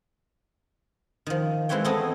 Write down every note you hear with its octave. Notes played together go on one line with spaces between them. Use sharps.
D#3 F3
E3 G#3 C4 B4 C#5 G5
A3 B3 C4 A4 D#5